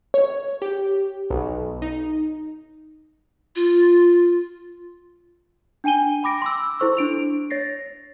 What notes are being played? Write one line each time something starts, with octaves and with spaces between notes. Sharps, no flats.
C#5
G4
B1
D#4
F4
D4 G5 G#5 D#7 G7
G5 B5 D6 A#6 D7
C6 D6 E6
E4 A4 C5 C#6 E6
D4 D7 F7
C#5 A6 A#6 C7